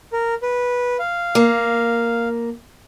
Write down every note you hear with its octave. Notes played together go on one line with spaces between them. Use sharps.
A#4
B4
F5
A#3